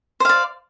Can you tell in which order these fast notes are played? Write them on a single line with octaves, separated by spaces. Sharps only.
C5 F5 D5